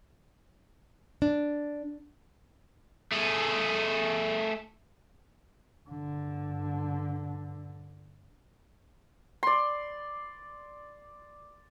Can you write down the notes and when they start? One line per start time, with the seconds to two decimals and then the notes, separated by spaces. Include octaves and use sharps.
1.22 D4
3.12 A3 G#4
5.87 G2 D3
9.43 D5 C6